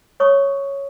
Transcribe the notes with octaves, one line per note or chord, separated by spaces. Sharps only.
C#5 C#6 D#6